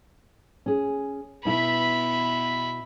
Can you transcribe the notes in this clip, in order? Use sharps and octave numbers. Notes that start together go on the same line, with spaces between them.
C#4 G#4
B2 E4 E5 B5